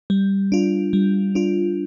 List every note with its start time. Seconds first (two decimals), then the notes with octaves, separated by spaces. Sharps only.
0.10 G3
0.52 D4 F4
0.93 G3
1.35 D4 F4